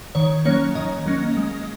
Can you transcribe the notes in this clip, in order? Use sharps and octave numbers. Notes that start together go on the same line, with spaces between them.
D#3 C#5
F#3 A#3 C#4 C#5
D#3 D#5
F#3 A#3 C#4
G#3